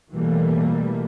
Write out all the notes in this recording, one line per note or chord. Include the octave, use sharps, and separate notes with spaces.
B2 E3 G3 A3 A#3